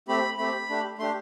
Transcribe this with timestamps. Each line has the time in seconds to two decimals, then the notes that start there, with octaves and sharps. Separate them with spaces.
0.08 A3 C4 G4 B5
0.38 A3 C4 G4 B5
0.69 A3 D4 G4
0.98 A3 D4 G4 C6